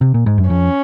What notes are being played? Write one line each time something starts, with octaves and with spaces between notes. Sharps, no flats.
C3
A#2
G#2
F#2
F2 C#4